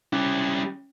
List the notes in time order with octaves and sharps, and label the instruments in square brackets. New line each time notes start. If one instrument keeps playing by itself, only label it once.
[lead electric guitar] G3 E4 [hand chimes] C#4